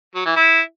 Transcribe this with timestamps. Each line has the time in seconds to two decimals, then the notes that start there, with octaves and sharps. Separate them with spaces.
0.15 F#3
0.26 E3
0.36 E4